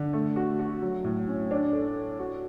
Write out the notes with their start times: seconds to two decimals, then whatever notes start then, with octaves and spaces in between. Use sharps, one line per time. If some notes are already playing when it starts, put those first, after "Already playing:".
Already playing: D3
0.13 A3
0.36 F#4
0.59 F#4
0.82 F#3
1.04 A2
1.28 C#4
1.51 D4
1.73 A4
1.95 C#5
2.19 F#4